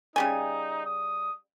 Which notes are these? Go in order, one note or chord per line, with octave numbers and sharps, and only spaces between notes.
C#3 G3 D#4 G#5
D#6